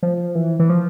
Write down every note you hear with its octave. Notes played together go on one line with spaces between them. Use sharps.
F3
E3
E3
F3